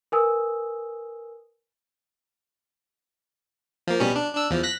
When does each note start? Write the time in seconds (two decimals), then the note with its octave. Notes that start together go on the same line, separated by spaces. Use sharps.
0.12 A#4 B4 G#5 D#6 E6
3.87 F3 A#3
4.00 B2 G3 C#4
4.16 D4
4.35 D4 E6
4.50 E2 F3
4.63 F#6 A#6 B6